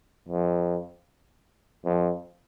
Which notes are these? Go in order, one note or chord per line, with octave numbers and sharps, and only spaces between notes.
F2
F2